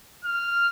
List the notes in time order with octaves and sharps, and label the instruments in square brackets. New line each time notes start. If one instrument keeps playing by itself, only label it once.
[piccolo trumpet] F6